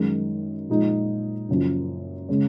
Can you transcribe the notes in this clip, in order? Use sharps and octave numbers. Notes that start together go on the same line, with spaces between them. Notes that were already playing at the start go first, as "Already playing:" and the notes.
Already playing: F#2 D#3 G#3 D#4
A#2 F3 G#3 D#4
F#1 F#2 F3
C#3 G#3 C#4